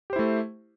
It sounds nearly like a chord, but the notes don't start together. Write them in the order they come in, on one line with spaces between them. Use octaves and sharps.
G4 C5 E4 A3